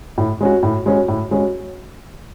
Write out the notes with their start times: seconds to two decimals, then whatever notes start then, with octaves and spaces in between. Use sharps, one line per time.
0.18 A2
0.41 G#3 C#4 F#4
0.63 A2
0.86 G#3 C#4 F#4
1.08 A2
1.31 G#3 C#4 F#4